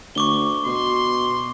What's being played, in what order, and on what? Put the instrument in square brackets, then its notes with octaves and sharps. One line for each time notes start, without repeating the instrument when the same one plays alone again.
[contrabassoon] D2 [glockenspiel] C#6 D6 G7
[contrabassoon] B2 [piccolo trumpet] C6